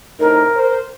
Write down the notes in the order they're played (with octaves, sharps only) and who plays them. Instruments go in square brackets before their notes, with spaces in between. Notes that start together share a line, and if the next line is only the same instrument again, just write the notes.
[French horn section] A2 C3 D#4 [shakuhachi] A#4
[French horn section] C5